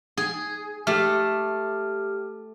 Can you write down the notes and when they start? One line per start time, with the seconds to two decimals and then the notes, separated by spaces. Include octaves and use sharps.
0.17 G#4
0.87 A3 G4 F6